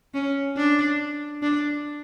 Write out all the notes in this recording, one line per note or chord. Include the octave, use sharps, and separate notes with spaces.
C#4
D4
D4